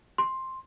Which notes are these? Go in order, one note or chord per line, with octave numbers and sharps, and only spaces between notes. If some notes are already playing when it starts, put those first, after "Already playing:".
C6